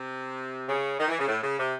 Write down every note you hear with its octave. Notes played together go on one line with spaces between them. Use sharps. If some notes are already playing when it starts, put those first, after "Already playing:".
Already playing: C3
C#3
D#3
E3
C#3
A2
C#3
C3